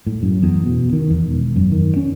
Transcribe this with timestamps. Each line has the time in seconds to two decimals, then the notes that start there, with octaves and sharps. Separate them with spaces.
0.07 A2
0.23 F#2
0.42 E2
0.66 B2
0.92 D#3
1.10 E2
1.26 E1
1.56 F#2
1.72 D#3
1.96 C#4